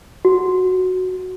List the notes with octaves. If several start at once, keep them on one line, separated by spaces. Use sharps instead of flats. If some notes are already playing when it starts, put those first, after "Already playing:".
F#4